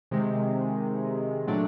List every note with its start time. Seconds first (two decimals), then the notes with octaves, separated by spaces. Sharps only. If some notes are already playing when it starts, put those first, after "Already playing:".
0.11 C3 D#3 G#3
1.47 A#2 F#3 A3 D4